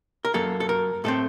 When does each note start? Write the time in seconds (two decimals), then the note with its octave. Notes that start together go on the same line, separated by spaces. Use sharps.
0.25 A#4
0.34 F#2 F#3 A#3 A4
0.60 A4
0.69 A#4
1.04 A2 A3 C4 A4